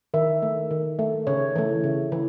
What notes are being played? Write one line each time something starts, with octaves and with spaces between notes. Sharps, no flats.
D#3 E5
A3
D#3
A3
C#3 C#5
E3 A3
C#3
E3